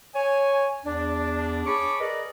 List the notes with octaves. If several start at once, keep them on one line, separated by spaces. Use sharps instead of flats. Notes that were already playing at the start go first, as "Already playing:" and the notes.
C#5 G#5
E2 D4
G#4 C#5 A5 B5 C#6 D6
G#4 A#4 B4 D5 D#5